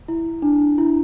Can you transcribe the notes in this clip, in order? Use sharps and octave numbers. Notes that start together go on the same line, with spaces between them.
E4
D4
E4